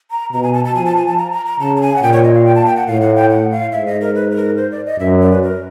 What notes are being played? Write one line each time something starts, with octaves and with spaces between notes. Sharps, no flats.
A#5
B2 A#5
G#5
A5
A5
F3 G#5
A5
G#5
A5
A#5
A#5
A#5
C#3 A5
A5
G#5
F#5
A#2 G5
C#5
D#5
F5
G5
A5
G5
F#5
A2 F5
F#5
G5
F#5
F5
G#2 E5
D#5
A#4
B4
B4
A#4
C5
D5
D#5
F#2 E5
D5
B4
A#4